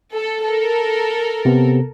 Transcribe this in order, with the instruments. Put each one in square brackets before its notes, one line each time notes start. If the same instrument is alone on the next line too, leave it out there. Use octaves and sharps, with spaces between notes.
[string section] A4
A4 A#4
[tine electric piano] C3 B3